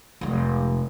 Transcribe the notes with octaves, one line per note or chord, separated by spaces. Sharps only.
F1 G#3